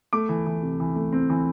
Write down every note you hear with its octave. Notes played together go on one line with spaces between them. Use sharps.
A3 D6
E3
E3
C3
E3
A3
C4
E3